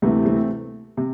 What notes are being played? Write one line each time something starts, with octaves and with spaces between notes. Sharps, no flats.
D2 C3 E3 A3
A3 C4
C3